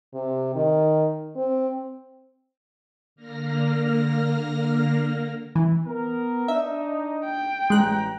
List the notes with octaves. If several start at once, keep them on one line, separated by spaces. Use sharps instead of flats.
C3
D#3
C4
D3 A#3 F6 A#6
E3
B3 A#4
D4 D#4 E5
G5
A1 G2 G#3 A#5 F#6